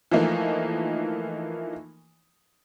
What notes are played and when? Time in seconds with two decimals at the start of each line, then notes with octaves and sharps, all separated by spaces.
0.12 E3 F3 A3 A#3 D#4